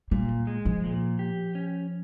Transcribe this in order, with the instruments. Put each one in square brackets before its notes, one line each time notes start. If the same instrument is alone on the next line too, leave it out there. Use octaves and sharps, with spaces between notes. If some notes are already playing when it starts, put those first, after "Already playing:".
[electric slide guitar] A#2 [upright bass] G3
[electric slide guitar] G#3
[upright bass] F3
[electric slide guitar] A#2
G4
C#4